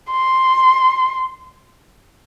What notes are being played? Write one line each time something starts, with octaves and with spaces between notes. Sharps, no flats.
C6